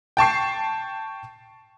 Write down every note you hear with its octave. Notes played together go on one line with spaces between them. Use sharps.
G5 A5 C#6 C7